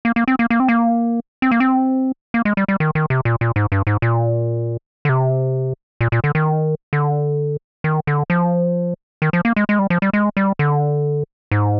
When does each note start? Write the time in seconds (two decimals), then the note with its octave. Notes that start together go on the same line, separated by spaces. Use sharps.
0.05 A#3
0.16 A#3
0.28 C4
0.39 A#3
0.50 A#3
0.60 C4
0.69 A#3
1.42 C4
1.51 A#3
1.60 C4
2.34 A#3
2.45 G#3
2.57 G3
2.68 G3
2.80 D#3
2.95 D#3
3.10 C3
3.25 A#2
3.41 A#2
3.56 G#2
3.72 G2
3.87 G#2
4.02 A#2
5.05 D3
5.09 C3
6.01 A#2
6.12 A#2
6.24 D3
6.35 D#3
6.93 D3
7.84 D#3
8.07 D3
8.30 F3
9.22 D#3
9.33 F3
9.45 A#3
9.56 G#3
9.69 G#3
9.79 G3
9.90 F3
10.02 G3
10.13 G#3
10.37 G3
10.59 D3
11.51 G#2